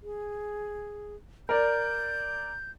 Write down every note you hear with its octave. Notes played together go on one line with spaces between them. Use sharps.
G#4
A#4 D5 G6